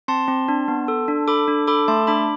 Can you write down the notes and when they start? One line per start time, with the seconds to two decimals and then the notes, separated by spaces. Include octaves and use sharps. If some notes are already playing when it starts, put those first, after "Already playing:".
0.08 C4 A5 C6
0.28 C4
0.48 D4
0.68 B3
0.88 A4
1.08 D4
1.28 A4 B5 D6
1.48 D4
1.67 A4 B5 D6
1.88 A3 A5 C6
2.07 D4 B5 D6